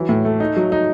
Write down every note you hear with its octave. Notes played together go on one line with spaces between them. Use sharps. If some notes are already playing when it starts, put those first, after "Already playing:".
Already playing: E3 F#3
A2
A3
D#4
F#3
D#4